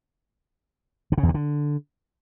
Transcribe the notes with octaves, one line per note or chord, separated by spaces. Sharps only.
D3
C#3
E2
C3
D3